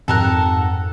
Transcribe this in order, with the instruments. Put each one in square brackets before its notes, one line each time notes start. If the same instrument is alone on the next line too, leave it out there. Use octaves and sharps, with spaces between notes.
[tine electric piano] F2 G5 [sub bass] G#2 [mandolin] A4 A#4 F#5